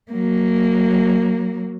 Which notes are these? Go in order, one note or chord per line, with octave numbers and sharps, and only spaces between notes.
F#3 A#3